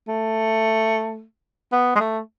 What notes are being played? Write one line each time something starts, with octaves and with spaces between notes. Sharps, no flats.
A3
B3
G#3
A3